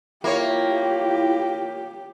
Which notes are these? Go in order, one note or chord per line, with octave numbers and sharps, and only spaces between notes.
A#3 E4 F4 G4 C#5